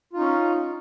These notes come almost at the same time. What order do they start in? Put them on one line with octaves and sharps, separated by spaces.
F4 D#4 C#4